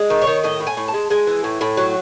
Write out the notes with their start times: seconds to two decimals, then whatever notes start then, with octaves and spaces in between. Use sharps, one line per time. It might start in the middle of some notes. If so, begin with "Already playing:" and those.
Already playing: G#3
0.10 D#3
0.22 C#5
0.27 D#3
0.44 A2 D#5
0.60 A2
0.67 G#5
0.77 A2
0.88 A5
0.94 G#3
1.10 G#3 G#5
1.27 E3
1.44 A2
1.61 A2
1.77 F#3